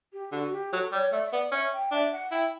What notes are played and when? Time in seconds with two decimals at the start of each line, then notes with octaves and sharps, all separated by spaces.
0.13 G4
0.32 D3 F#4
0.52 G4
0.73 F#3 A4
0.92 G3 C#5
1.12 A3 D5
1.26 E5
1.32 B3 D5
1.52 C#4 E5
1.73 G5
1.92 D4 E5
2.12 F#5
2.32 E4 G5